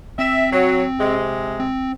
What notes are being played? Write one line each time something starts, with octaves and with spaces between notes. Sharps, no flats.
C4 E5
F#3
C3 G#3
C4